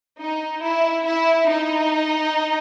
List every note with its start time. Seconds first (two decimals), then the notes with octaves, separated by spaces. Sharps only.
0.20 D#4
0.62 E4
1.05 E4
1.48 D#4